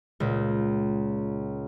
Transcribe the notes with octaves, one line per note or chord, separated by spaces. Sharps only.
C#2 A#2